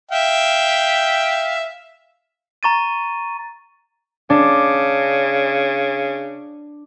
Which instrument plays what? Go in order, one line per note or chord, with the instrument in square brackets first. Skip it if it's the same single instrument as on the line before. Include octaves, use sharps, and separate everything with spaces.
[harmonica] E5 F5 G5
[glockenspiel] A#5 C#6 A6 D#7
[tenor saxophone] C#3 [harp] D4